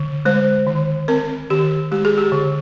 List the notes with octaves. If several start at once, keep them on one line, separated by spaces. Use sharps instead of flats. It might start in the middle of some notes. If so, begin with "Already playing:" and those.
Already playing: D3
G#3 C5
D#3
C4 A#4
D#3 G4
G#3 G4
G#4
G4
D3